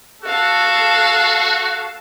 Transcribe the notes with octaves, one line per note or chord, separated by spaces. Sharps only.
F#4 A4 F5 A5